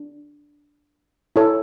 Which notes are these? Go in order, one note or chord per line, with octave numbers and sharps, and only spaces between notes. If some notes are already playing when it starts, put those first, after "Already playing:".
Already playing: D4
E4 A4 C#5